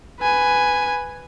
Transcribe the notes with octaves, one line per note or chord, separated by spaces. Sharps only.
B4 G#5